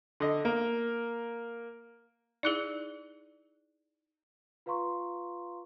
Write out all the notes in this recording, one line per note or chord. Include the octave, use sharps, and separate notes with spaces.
D3 D#5
A#3
D#4 E4 G#4 D5 F#6 G7
F4 B4 F5 A#5 C6 C#6